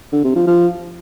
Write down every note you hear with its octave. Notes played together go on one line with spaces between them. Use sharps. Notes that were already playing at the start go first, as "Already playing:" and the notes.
D3
C3
F3
F3